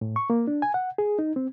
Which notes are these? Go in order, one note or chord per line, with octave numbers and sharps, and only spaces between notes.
A2
C#6
A#3
D4
G#5
F#5
G#4
D#4
C4